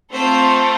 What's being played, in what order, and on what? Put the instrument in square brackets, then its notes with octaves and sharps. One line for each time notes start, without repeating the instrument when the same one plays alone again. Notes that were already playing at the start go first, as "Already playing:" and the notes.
[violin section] A3 C4 F4 A4 C5